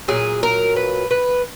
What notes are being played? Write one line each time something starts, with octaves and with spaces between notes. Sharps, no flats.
A#2 F#3 G#4
A#4
B4
B4